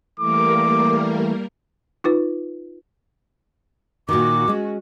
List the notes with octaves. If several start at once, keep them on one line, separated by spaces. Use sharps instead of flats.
E3 G3 A3 A#3 A#4 D6
D#4 F4 B4
A#2 D#3 F#4 D6
G#3 C#4